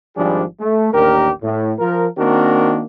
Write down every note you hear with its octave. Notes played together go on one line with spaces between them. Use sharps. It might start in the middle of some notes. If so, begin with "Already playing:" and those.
G#1 F3 G3 D4 G#4
A3
A1 D#2 D4 G4 A#4
A2
F3 A#4
D#3 A#3 C4 D4 F#4 A#4